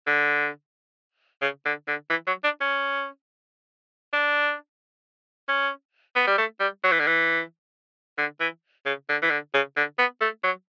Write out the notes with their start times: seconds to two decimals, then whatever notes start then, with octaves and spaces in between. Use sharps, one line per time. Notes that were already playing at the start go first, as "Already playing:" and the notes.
0.07 D3
1.42 C#3
1.65 D3
1.88 D3
2.10 E3
2.27 F#3
2.44 D4
2.61 C#4
4.13 D4
5.48 C#4
6.16 B3
6.27 G3
6.38 A3
6.60 G3
6.84 F#3
6.92 E3
7.00 D3
7.07 E3
8.18 D3
8.40 E3
8.86 C#3
9.09 D3
9.22 E3
9.30 D3
9.54 C#3
9.76 D3
9.99 B3
10.21 A3
10.44 F#3